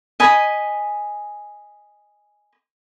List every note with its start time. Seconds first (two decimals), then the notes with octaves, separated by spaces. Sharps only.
0.20 D#5 G#5 B5